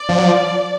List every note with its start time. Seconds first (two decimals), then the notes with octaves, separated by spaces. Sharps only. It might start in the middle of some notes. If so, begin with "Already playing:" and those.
Already playing: D5
0.09 F3
0.18 F#3
0.25 F3